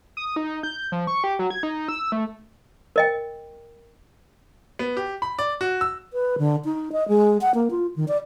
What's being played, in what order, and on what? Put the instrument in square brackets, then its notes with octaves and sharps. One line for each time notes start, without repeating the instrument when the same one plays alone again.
[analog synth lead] D#6
D#4
G6
F3
C#6
G4
F#3
G#6
D#4
E6
A3
[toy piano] A#4 D#5 G5
[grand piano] B3
G4
B5
D5
F#4
E6
[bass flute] B4
D3
D#4
D#5
G#3
F#5
A#3
F4
D#3
D5